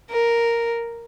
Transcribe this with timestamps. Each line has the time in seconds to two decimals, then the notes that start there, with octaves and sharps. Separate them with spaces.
0.10 A#4